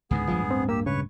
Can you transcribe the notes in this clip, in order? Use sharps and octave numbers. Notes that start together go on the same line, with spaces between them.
C#2 G#2 D3 B3 G#4
D1 G2 F3 G#3
C4
A#3 G4 E6
C#3 B4 C#5 C#6